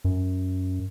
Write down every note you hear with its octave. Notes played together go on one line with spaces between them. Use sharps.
F#2